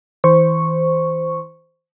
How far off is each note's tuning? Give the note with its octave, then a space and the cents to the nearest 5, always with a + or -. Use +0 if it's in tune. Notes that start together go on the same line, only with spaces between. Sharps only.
E3 -30 C5 -5 C#6 -5